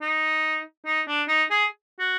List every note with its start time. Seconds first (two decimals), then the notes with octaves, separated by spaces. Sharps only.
0.02 D#4
0.86 D#4
1.08 D4
1.28 D#4
1.50 G#4
2.00 F#4